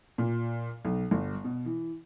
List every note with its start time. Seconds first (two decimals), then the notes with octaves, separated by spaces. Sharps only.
0.18 A#2
0.85 B1
1.11 G1
1.44 B2
1.65 E3